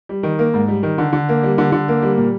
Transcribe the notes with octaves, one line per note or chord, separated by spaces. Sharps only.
G3
D#3
A#3
G#2
G3
D#3
D3
D3
A#3
G3
D3
D3
A#3
G3
A#2